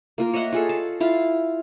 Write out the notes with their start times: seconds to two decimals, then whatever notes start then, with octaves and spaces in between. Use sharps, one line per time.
0.18 A#3 F4 A#4
0.33 C#5 D#5 E5 F#5
0.53 F4 G#4 A4
0.69 A5
1.00 E4 F4 F5